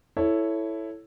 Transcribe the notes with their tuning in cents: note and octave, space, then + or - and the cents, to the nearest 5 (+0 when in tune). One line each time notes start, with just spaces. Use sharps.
E4 +0 A4 +0 C#5 +0